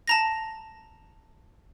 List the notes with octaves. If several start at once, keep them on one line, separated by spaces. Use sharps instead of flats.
A5 A#5 A#6